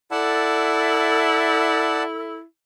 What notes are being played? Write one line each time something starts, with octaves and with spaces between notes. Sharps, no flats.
E4 A4 D5 F#5 A5